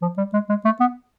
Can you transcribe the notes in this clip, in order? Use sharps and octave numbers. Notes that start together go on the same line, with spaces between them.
F3
G3
G#3
G#3
A3
B3